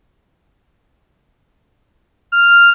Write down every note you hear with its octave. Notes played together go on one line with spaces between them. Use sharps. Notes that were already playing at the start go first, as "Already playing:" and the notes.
F6